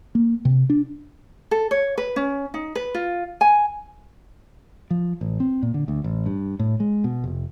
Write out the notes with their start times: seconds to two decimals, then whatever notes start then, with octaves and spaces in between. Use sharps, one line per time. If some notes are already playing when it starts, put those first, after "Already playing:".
0.15 A#3
0.45 C3
0.70 D4
1.51 A4
1.71 C#5
1.98 B4
2.16 C#4
2.54 D#4
2.75 B4
2.94 F4
3.41 G#5
4.90 F3
5.21 A1
5.40 C4
5.63 A#2
5.74 D3
5.88 D2
6.04 A1
6.26 G2
6.59 A2
6.80 G#3
7.04 B2
7.24 F1